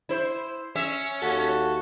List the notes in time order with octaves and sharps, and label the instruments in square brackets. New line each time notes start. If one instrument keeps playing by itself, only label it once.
[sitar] E4 C5
[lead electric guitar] C#4 [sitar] E5
[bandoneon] D#2 F#4 [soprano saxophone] A4